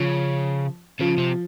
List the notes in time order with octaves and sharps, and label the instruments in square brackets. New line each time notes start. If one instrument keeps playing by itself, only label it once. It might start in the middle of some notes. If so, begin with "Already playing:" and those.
Already playing: [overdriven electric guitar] C#3 [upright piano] F3
[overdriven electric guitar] C#3 [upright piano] F3
[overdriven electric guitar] C3